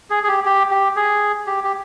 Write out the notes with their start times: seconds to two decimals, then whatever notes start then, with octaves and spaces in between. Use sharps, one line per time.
0.10 G#4
0.23 G#4
0.28 G4
0.45 G4
0.71 G4
0.96 G#4
1.47 G4
1.64 G4